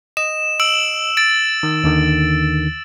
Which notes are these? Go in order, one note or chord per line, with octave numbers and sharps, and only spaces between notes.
D#5 E7
E6 D7 F#7
A6 D7
D#3
D#2 D3 D#3